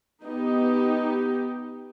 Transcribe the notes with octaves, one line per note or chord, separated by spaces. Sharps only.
B3 D#4 G4